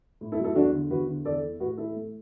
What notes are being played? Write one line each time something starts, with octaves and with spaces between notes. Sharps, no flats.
A2
E4 A4
F#3
E4 A4
E2 D4 F#4
D3
E2 F#4 B4
D3
E2 A4 D5
E3
A2 F#4 B4
E3 E4 A4
A3